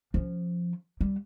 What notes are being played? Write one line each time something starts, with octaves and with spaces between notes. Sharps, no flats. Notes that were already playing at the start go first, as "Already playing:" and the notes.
F3 C#4
G3